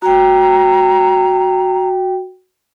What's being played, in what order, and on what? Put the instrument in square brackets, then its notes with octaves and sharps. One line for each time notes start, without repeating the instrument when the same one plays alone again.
[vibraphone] F#4 G5 [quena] A#5